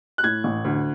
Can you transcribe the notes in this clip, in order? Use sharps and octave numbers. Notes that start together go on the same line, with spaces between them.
F#6
A2 G#6
A1
D2